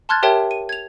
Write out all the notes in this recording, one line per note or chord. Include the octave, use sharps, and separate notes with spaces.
A5 C6 F6 F#6 G#6 A6
G4 A#4 C#5 E5 G5 A5
D#7
G#6 F7